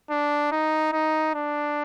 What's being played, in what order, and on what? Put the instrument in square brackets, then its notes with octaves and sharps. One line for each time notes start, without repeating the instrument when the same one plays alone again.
[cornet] D4
D#4
D#4
D4